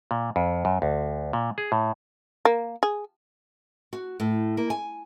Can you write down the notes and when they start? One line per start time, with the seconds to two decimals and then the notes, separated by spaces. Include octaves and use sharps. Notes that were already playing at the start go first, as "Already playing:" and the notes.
0.11 A#2
0.36 F2
0.65 F#2
0.82 D2
1.33 A#2
1.58 G#4
1.72 A2
2.45 A#3
2.83 G#4
3.93 F#4
4.20 A2
4.57 A#3
4.70 G#5